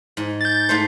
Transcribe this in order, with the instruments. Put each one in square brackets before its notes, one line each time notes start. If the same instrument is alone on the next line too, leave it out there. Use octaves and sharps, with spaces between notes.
[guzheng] G#2
[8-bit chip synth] G6 A6
[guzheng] G#2 A3 C5